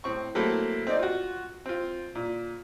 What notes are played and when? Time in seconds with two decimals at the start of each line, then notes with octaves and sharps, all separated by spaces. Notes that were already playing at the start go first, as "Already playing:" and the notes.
0.04 A2 C4 C#6
0.35 F#3 A3 A#3 C4 E4 A4
0.87 C4 D#4 D5
0.99 F4 F#4
1.66 C4 F4
2.15 A#2